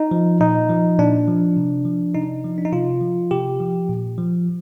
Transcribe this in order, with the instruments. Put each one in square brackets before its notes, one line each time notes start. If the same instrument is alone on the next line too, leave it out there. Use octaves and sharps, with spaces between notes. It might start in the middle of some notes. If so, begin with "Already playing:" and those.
Already playing: [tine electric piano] D#4
F3
A#2 D#4
F3
A#2 D4
F3
C3
F3
C3 D#4
F3
D4
D#4
C3 F4
F3
C3 G4
F3
A#2
F3